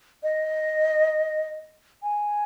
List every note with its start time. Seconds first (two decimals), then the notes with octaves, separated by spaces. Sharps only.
0.23 D#5
2.03 G#5